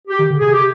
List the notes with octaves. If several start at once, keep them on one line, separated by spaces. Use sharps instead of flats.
G4
D#3
D3
C3 G#4
G4